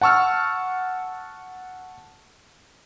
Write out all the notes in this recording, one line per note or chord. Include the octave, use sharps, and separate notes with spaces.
F#5 A5 C#6 E6 F6